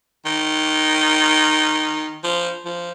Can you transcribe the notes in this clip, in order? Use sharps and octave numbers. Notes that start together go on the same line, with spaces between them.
D#3
F3
F3